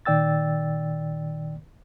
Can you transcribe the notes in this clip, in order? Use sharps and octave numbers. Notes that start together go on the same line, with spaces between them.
A#2 D#3 D5 G5 E6 A6